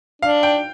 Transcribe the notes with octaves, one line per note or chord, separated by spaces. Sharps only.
D4 F5
G5